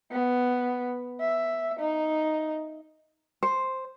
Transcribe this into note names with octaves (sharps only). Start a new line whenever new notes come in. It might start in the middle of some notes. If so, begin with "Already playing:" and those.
B3
E5
D#4
C5